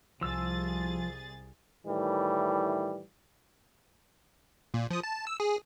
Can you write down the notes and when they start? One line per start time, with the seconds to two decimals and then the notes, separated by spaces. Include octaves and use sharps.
0.21 C2 F3 G#4 E6 A6
1.86 A2 D#3 E3 G3
4.74 A#2
4.91 F3 D#6
5.03 A5
5.27 E6
5.40 G#4